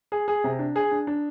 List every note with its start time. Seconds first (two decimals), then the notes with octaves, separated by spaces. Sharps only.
0.12 G#4
0.28 G#4
0.44 C3
0.59 D4
0.76 G#4
0.91 D4
1.07 D4